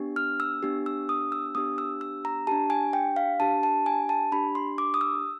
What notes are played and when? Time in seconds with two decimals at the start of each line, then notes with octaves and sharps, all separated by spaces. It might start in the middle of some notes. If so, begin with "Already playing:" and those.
Already playing: B3 D4 G4
0.16 F6
0.40 E6
0.63 B3 D4 G4
0.86 E6
1.09 D#6
1.32 E6
1.55 B3 D4 G4 D#6
1.78 E6
2.01 E6
2.25 A#5
2.47 D4 G4 A5
2.70 G#5
2.93 G5
3.16 F5
3.40 D4 G4 A5
3.63 A5
3.86 G#5
4.09 A5
4.32 D4 G4 B5
4.55 C6
4.78 D6
4.94 D#6
5.01 E6